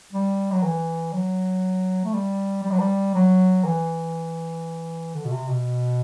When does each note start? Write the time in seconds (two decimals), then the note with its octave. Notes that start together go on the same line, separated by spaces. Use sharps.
0.13 G3
0.52 F#3
0.63 E3
1.13 F#3
2.05 A3
2.14 G3
2.63 G3
2.71 F#3
2.79 G3
3.15 F#3
3.64 E3
5.14 D3
5.25 B2
5.32 C3
5.48 B2